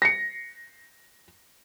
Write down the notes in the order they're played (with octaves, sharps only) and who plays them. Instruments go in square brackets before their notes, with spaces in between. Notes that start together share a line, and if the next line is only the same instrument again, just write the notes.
[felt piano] A#6 C7 C#7